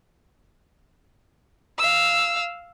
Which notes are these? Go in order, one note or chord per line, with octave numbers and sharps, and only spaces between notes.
F5 E6